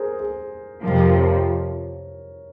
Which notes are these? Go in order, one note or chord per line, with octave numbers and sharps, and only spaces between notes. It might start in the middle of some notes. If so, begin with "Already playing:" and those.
Already playing: G#4 A#4 C5
G#4
F2 C3 F3 A#4
A#4
A#4 C#5